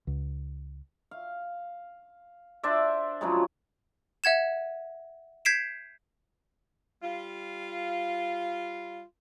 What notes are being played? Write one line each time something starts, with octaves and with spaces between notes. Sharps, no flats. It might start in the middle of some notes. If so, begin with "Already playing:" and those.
C#2
F5
D4 C5 D5 E5
C#3 F3 F#3 G#3
E5 F#5 G#6 E7
G6 G#6 B6 C7 D7 E7
G3 F4